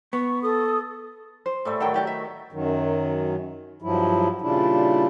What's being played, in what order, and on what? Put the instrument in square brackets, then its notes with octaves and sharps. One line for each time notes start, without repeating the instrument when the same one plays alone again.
[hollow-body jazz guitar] B3 [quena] C#6
[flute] A4 [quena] D#6
[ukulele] C5
[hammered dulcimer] A2 G3 A3
[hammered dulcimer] D#3 F#3 [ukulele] A4 F#5 G5
[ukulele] F#4 G4 D5
E5
[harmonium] F#2 D#3 F#3
G2 F3 F#3 E4
A#2 C#3 G3 D4 E4